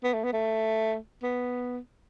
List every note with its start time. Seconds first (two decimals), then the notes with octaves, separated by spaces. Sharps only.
0.03 B3
0.13 A3
0.24 B3
0.33 A3
1.23 B3